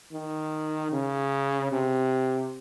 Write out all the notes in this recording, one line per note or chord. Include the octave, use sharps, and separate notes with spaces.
D#3
C#3
C3